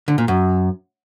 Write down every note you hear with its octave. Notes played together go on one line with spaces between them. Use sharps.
D3
A#2
F#2